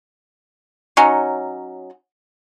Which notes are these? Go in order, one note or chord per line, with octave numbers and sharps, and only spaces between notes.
F#3 C#4 D#4